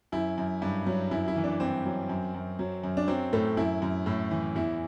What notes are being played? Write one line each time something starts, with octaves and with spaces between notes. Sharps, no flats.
F#2 E4
F#2
G2
F#3
F#2 E4
E4
E3
D4
G2 C4
F#3
F#2
F#2
F#3
F#2
D4
F#3 C4
A2 A3
F#2 E4
F#2
A2
E3
E2 E4